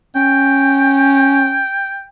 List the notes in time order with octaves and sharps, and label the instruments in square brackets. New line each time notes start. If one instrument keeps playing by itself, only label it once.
[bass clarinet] C#4 [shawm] G5